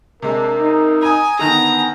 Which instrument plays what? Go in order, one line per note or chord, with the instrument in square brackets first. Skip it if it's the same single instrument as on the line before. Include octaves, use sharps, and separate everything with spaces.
[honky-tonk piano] C3 G#3 [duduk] D4 [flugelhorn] A#4
[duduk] D#4
[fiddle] G#5 [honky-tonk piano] A#5 D#6
[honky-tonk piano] D3 D#3 G#5 [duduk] B3 [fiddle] A#5